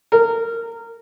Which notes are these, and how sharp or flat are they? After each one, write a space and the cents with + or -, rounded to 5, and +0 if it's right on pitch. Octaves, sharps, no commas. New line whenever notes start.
A#4 -20